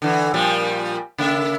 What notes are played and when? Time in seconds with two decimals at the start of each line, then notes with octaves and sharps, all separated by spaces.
0.02 D3 E3
0.34 A#2 F3 G3
1.18 C#3 A#3 E5